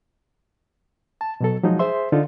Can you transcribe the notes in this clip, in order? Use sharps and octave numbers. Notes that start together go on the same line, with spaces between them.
A5
B2 F#3 A4
F3 F#3 G#3 D#4
G#4 C5 E5 C6
D3 D#4 F4 A4